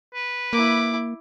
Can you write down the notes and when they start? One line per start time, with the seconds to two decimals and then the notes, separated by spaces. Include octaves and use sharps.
0.14 B4
0.53 A#3 E4 D6